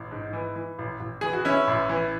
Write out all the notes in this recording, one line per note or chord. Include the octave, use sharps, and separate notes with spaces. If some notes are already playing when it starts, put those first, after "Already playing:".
Already playing: A1
G#2
E3
E3
A1
A1
E3 G#4
F#4
E3 C#4 E4
A1
E3